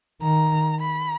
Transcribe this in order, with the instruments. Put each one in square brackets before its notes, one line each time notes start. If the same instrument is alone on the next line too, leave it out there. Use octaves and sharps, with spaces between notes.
[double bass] D#3 [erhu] A#5
[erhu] B5